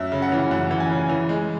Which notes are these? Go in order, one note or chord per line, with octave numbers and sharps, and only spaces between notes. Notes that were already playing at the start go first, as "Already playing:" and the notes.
Already playing: F#2 E5
C#3
F#5
E3
F#2 F#5
E3
G#5
C#3
E3
G#3